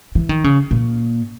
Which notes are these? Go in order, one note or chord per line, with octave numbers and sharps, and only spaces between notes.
E3
D#3
C#3
A#2